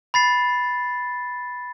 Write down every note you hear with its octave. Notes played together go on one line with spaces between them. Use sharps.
B5 A6 C7